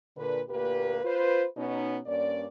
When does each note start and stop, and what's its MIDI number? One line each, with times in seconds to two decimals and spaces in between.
0.16 0.41 46
0.16 0.41 50
0.16 0.41 71
0.49 0.99 38
0.49 0.99 46
0.49 0.99 58
0.49 0.99 67
0.49 0.99 71
1.04 1.45 65
1.04 1.45 71
1.04 1.45 72
1.57 1.99 47
1.57 1.99 59
1.57 1.99 61
1.57 1.99 63
2.06 2.46 43
2.06 2.46 58
2.06 2.46 61
2.06 2.46 74